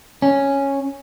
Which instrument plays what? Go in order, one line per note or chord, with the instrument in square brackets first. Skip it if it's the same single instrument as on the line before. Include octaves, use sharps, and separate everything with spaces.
[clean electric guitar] C#4